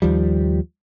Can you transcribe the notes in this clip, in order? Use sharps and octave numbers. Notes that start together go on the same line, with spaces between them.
D#2 F3 G3